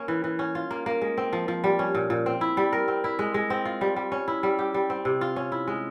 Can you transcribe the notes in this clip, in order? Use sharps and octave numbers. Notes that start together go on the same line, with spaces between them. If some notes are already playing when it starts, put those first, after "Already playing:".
Already playing: A#3 C#4
E3
E3
C#4
F4
A#3
A#3
G#3
C4
F3
F3
G3
C#4
A#2
A#2
C4
E4
G3
A#4
C4
E4
G#3
G#3
C4
F4
G3
G3
C#4
E4
G3
G4
G3
C4
C3
F4
C#4
E4
G#3